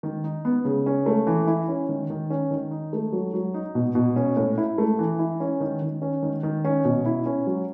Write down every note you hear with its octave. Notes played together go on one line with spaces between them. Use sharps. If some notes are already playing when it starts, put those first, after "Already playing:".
D#3
D#4
B3
C#3
C#4
A3
E3
E4
C#4
D#3
D#3
C#4
D#3
D#4
A3
F#3
F#3
D#4
B2
B2
C#4
A2
E4
A3
E3
E4
C#4
D#3
D#3
C#4
D#3
D#3
C#4
B2
E4
C#4
F#3